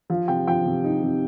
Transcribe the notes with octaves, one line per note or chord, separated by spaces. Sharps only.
F3 F5
C3 G5
F3 G5
C3
D#4
C3